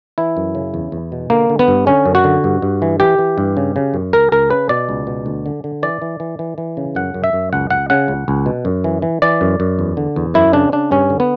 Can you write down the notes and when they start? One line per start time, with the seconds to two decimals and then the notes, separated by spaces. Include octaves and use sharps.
0.18 E3 E4
0.37 F#2
0.55 C#3
0.74 E2
0.92 E2
1.12 B2
1.30 D3 A#3
1.50 D3
1.59 B3
1.68 G2
1.86 D3 C#4
2.05 F#2
2.15 F#4
2.24 D3
2.44 G2
2.62 G2
2.82 E3
3.00 E3 G4
3.18 E3
3.38 G2
3.57 C#3
3.76 C#3
3.94 F#2
4.13 C#2 A#4
4.32 C#2 A#4
4.50 C#3 B4
4.69 B2 D5
4.89 C#2
5.07 B2
5.26 D2
5.46 D3
5.64 D3
5.83 E3 D5
6.02 E3
6.20 E3
6.39 E3
6.58 E3
6.77 C#3
6.95 F#2 F#5
7.14 F#2
7.24 E5
7.33 F#2
7.53 C#2 F#5
7.70 C#2 F#5
7.90 C#3 F#5
8.08 C#2
8.28 C#2
8.46 B2
8.65 F#2
8.84 E3
9.02 E3
9.22 E3 D5
9.41 F#2
9.60 F#2
9.79 E2
9.97 D3
10.16 E2
10.34 F#2 E4
10.53 C#3 D4
10.72 C#3 D4
10.91 G2 C#4
11.10 D3
11.20 B3